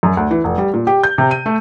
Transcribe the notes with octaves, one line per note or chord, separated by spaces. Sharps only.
F#2
D2
E3
F1
G3
A#2
G4
G6
C3
D#7
A3